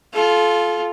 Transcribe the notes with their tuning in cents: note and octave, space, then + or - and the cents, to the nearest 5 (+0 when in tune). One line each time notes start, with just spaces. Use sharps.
F4 +0 A4 -30